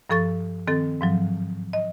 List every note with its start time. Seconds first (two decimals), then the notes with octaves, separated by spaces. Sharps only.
0.10 G2 F3 A4 C#6 A6
0.67 D#3 C4 A4 A6
1.01 G#2 F3 F#3
1.73 D#5